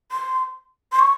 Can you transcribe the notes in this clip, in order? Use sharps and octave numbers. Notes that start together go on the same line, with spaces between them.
C6
C6
C#6